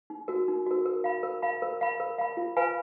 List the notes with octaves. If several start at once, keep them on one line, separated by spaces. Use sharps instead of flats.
D#4
F#4 A#4
D#4
F#4 A#4
A#4
F5 B5
A#4
F5 B5
A#4
F5 B5
A#4
F5 B5
F4
B4 F5 G#5 B5